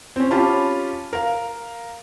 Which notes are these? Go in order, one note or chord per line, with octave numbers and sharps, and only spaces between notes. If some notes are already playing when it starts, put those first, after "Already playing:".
C4 C#4
C#4 F4 G4 A5 B5
A#4 F5